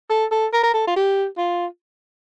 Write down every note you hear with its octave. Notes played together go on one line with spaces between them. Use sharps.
A4
A4
A#4
A#4
A4
F4
G4
F4